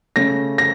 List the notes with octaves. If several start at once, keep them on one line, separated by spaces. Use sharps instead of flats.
C#3 A3 C#4 A#6
A#6